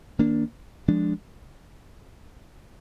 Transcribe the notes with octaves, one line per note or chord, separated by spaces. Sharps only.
D#3 A#3 D4
F3 G#3 D4